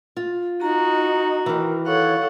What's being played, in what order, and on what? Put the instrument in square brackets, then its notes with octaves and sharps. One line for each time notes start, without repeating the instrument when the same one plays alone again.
[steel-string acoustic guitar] F4
[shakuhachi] D#4 [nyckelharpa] F#4 [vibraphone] A#5
[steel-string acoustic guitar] D#3 E3 [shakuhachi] A#4
[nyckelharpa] A4 F#5 [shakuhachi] C#5 [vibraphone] F5 C#6